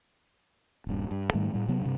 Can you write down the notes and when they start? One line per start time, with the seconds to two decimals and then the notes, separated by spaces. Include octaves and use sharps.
0.87 D#1 G2
1.11 G2
1.34 G#2 D#3 G3 A3
1.53 A2 G3
1.68 C3 F#3 B3
1.82 G2 C3